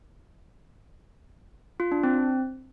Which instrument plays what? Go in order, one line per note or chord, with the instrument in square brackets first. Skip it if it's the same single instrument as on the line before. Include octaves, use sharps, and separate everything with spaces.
[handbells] F4
D4
C4